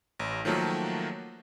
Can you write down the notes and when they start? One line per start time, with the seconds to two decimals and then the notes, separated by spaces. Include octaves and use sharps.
0.20 A1
0.45 D#3 F3 F#3 A3 A#3